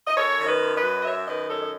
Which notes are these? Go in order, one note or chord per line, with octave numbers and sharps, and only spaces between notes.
D#5
F#2 A4 C#5
D#3
B4 D#5
F#2
B4 D#5
F#3
D#5
F#2 C#5 E5
D#3 B4 D#5
F#2 A4 C#5
D#5